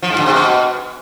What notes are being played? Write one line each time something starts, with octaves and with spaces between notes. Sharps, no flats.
F3
G#2
D3
C3
B2